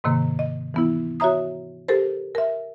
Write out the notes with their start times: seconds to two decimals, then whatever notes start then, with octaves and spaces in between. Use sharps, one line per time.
0.04 G#2 C3 D#3 A#3
0.39 D#5
0.74 E3 B3 E4
1.20 F#4 C#5 E5 A#5 D#6
1.88 G4 A4 A#4 C5
2.35 A#4 E5